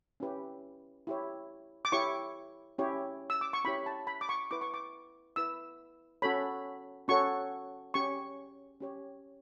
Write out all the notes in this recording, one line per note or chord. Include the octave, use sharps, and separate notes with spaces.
C#4 E4 G4 B4
E4 G4 C#5
D6
E4 G4 C#5 C#6
C#4 E4 G4 C#5
E6
D6
C#6
C#4 E4 G4 C#5 B5
A5
B5
D6
C#6
E4 B4 D6
C#6
D6
E4 B4 E6
C#4 F#4 A4 C#5 B5
C#4 F#4 A4 C#5 C#6
C#4 G4 C#5 C#6
C#4 G4 C#5